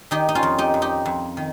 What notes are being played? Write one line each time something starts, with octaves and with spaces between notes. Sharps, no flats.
D#3 D#4 G4
D#4
C#4 F4
F2
D#4 G4
F2
D#4 G4
F2
D#3